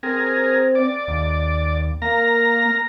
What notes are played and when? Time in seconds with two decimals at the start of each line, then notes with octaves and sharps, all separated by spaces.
0.03 C4 G#4 A#4
0.75 D5
1.08 D#2
2.02 A#3 A#4 A#5